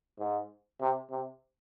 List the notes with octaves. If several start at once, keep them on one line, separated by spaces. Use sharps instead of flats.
G#2
C3
C3